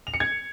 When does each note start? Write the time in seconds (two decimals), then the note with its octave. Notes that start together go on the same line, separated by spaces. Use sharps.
0.07 F7
0.14 C#7
0.20 G#6